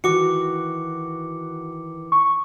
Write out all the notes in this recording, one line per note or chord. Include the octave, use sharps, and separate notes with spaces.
D#3 E3 F#4 D6 C#7
C#6